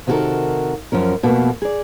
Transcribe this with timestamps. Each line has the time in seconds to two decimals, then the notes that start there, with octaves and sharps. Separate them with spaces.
0.07 C3 D#3 F#4 G4 A4 A#4
0.92 F#2 F3 C#4 A#4
1.23 F2 B2 A3 A#3
1.62 G#4 D5